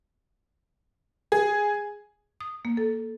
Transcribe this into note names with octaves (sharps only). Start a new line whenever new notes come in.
G#4
D#6
A#3
A4